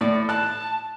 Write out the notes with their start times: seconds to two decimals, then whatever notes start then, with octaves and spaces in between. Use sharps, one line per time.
0.01 A2 D5
0.29 A5 F#6